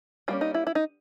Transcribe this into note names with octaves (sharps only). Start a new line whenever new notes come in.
G3 A#3 C#4 F4
D#4
E4
E4
D#4